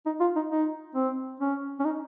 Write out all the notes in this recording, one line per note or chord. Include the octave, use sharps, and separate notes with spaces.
D#4
F4
D#4
D#4
C4
C#4
C#4
D#4